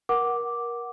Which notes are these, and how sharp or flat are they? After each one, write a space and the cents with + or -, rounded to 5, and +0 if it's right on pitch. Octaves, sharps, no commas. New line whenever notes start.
A#4 +25 F#5 +0 D6 +0